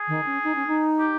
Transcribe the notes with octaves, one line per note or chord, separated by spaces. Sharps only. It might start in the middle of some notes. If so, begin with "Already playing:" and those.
Already playing: G#4
D#3
C#4
D#4
C#4
D#4
G4